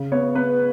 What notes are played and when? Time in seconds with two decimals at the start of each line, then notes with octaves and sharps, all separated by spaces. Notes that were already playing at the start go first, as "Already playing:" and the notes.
Already playing: C#3
0.12 B3 C#5
0.35 B3 B4